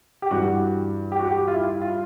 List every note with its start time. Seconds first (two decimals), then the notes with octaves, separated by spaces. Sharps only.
0.22 G4
0.31 G2 E3 F#4
1.12 G4
1.19 F#4
1.27 G4
1.48 F4
1.53 E4
1.82 F4